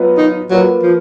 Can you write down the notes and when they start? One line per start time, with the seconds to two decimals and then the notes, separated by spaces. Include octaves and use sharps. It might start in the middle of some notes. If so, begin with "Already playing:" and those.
Already playing: F#3 B3 F4 B4 D#5
0.18 D#4
0.50 F#3 A#3 F4 B4
0.83 F3